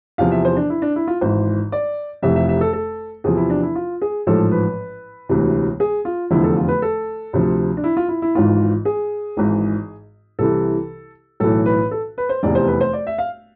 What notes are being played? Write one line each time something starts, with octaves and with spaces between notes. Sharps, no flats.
E2 C3 F3 F5
E5
C5
D4
E4
D4
E4
F4
G#1 G#2 E3 C5
D5
F1 F2 C3 E3 E5
E5
E5
A4
A4
E2 C3 F3 G#4
E4
D4
E4
F4
G#4
A1 G#2 F3 A4
B4
E1 D2 C3 E3
G#4
F4
F1 E2 D3 F3 E4
A4
F4
B4
A4
D2 C3 F3
D4
E4
F4
E4
E4
G#1 G#2 E3 F4
G#4
G#1 G#2 E3
C2 C3 E3 A4
B1 A2 E3 A4
B4
A4
B4
C5
F1 E2 C3 D5
C5
B4
C5
D5
E5
F5